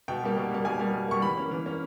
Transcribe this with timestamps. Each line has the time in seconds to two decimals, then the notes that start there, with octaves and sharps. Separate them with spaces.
0.08 B2 G5
0.23 G3 A#3
0.37 B2
0.51 G3 A#3
0.65 B2 G#5
0.79 G3 A#3
0.94 B2
1.08 G3 A#3 C#6
1.22 E3 B5
1.38 A#3 C#4
1.51 E3
1.66 A#3 C#4